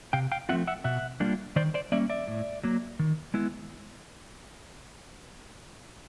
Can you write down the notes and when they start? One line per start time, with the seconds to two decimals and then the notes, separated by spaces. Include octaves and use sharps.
0.13 C3 F5 G5
0.32 F5 G5
0.49 F3 A3 C4 F4 E5 F#5
0.67 E5 F#5
0.84 B2 E5 F#5
1.20 G3 A#3 D4 F4
1.56 D#3 C5 D5
1.74 C5 D5
1.92 G3 A#3 C#4 D5 E5
2.10 D5 E5
2.28 A2
2.64 F#3 A#3
2.99 D#3
3.34 G#3 B3 E4